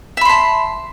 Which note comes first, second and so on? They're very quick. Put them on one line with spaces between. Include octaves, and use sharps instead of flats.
E5 B5 C6 A5